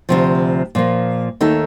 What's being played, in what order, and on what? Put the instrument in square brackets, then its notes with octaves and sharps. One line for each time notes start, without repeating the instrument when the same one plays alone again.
[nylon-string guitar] D2 C3 F3
A#2 F3 A#3
D#2 D#3 A3 D#4 A4